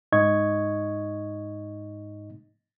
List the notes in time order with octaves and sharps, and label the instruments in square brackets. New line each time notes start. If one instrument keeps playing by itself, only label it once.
[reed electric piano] G#2 D#4 D#5 C#6 G#6